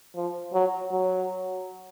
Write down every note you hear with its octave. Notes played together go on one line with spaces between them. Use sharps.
F3
F#3
F#3